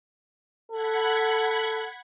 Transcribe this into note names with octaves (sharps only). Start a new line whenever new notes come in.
A4 F#5 B5 G#6